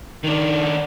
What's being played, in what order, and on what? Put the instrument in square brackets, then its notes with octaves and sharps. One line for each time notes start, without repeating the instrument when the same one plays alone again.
[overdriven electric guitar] D#3 D4